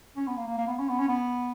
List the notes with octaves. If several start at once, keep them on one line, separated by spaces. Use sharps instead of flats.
C#4
B3
A#3
A#3
A#3
B3
C#4
B3
C#4
B3